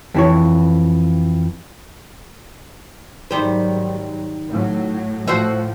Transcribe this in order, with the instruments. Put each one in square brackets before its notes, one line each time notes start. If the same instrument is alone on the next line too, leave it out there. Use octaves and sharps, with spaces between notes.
[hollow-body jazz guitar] F2 E3 C#5
[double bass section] G#2 F#3 [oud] D#3 G3 C5
[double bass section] A2 F#3
[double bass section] A2 F3 [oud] F#4 C5 E5